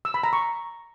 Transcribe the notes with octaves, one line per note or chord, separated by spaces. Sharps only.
E6
B5
A#5
C#6